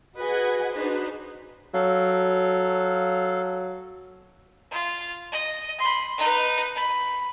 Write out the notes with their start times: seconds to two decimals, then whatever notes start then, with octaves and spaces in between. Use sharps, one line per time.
0.16 F#4 G#4 B4 D#5 F#5 G#5
0.72 D4 D#4 F#4 G#4 B4 C5
1.74 F#3 A4 F5
4.71 F4
5.32 D#5
5.80 B5 C6
6.18 D#4 B4
6.76 B5